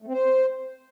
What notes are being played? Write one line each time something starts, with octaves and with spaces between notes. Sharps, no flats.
A3
C4
C5